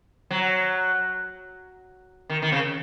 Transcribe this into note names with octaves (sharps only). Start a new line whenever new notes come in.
F#3
D#3
D#3
C#3